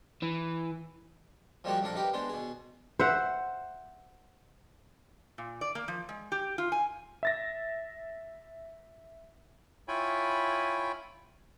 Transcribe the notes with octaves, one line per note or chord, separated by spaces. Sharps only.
E3
F3 G3 G#3 A#3 F#4 G4
A#1 F2 D4 A4 A#4
D#4 G4 A#4 B4
G#3 B3 D4 C5
B2 G#4
C5 E5 F#5
A#2
D5
A#3
F3
G#3
G4
F4
G#5
E5 A6 A#6
E4 F4 C#5 G5 G#5 B5